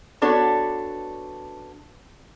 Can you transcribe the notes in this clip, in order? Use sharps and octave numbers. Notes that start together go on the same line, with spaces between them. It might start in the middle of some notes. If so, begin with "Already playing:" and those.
B3 D4 F#4 A4 B4 C#5